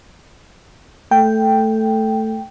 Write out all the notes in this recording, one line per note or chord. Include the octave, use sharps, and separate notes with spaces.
A3 G5